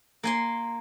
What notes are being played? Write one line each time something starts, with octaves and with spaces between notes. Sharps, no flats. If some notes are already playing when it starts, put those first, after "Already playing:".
A#3 G#5 C6